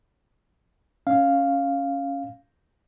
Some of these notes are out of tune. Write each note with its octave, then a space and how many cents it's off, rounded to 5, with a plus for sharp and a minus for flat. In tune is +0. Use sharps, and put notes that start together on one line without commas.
C#4 +0 F5 +0